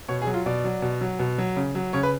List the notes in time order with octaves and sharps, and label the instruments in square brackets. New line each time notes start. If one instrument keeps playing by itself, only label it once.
[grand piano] B2 C#5
G#4
F#3
F4
B2 D5
F#3
B2
F#3
B2
F#3
C#3
F#3
C#3 C#5
B4